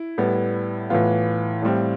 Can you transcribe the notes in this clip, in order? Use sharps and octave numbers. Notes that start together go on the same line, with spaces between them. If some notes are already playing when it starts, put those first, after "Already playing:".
Already playing: E4
A2 G3 B3
A2 E3 B3 F4
A2 G3 C4